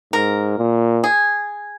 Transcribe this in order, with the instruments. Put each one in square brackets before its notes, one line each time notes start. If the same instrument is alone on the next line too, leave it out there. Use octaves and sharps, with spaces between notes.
[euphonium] G#2 [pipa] A#4
[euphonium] A#2
[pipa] G#4